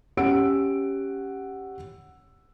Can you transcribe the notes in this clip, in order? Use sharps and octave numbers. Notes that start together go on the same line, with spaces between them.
C#4 G4 F#5 E6 D7